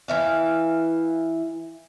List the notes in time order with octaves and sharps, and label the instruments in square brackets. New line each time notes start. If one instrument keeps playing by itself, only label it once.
[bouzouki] E3 E5 F5